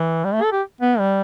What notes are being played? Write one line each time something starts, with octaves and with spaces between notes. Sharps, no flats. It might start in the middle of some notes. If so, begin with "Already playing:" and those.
Already playing: E3
G3
A3
A4
G4
B3
G3